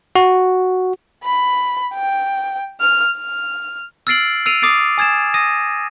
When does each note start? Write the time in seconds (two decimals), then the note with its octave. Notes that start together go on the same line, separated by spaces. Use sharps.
0.16 F#4
1.23 B5
1.94 G5
2.80 F6
3.18 F6
4.07 E6 F6 A6 C7 D7 F#7
4.46 E6 C7 D7 D#7 F7
4.62 D6 D#6 A6 C7 D7
4.98 G#5 D#6 G#6 A6 E7
5.34 D#6 A#6 D#7